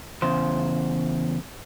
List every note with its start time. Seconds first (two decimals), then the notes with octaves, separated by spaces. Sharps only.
0.22 E2 C#3 C5